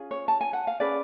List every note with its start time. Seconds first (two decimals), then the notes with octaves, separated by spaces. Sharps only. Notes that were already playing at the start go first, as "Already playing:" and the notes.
Already playing: C#4 F4 G#4
0.11 C#5
0.28 A5
0.41 G#5
0.53 F#5
0.67 F5
0.80 C#4 G#4 B4 D5